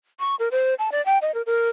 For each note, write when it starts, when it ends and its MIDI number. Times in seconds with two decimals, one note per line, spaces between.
0.20 0.35 85
0.39 0.49 70
0.51 0.75 72
0.79 0.90 81
0.92 1.04 74
1.06 1.18 79
1.22 1.34 75
1.34 1.42 70
1.46 1.69 70